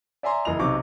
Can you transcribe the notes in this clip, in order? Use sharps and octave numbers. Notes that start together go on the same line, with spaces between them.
D5 E5 G#5 A#5 C6
F#1 E3 D#5 F7
B1 C3 D#4 C#6 D6